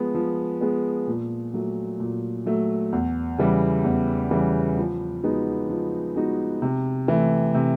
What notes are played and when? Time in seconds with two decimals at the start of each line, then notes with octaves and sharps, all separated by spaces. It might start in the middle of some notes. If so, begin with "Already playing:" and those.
Already playing: F3 G#3 B3
0.15 F3
0.61 G#3 B3
1.07 A#2
1.54 F#3 A3
2.00 A#2
2.46 F#3 A3
2.92 E2
3.38 C#3 E3 G3
3.84 E2
4.31 C#3 E3 G3
4.77 F3
5.23 G#3 B3 D#4 F#4
5.69 F3
6.16 G#3 B3 D#4 F#4
6.62 C3
7.08 E3 A3
7.54 C3